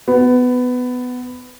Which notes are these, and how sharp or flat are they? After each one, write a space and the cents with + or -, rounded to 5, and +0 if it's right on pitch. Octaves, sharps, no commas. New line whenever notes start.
B3 +15